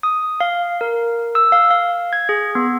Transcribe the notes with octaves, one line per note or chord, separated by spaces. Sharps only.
D#6
F5
A#4
E6
F5
F5
G#6
G#4
B3